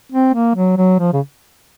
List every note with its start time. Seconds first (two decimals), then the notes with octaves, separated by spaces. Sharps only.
0.12 C4
0.34 A#3
0.55 F#3
0.77 F#3
0.99 F3
1.13 C#3